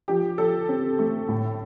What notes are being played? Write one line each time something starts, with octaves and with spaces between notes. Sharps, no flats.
F3 G4
F3 A4
C4
A3
A2